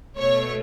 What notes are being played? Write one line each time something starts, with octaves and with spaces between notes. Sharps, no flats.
B2 A3 C#5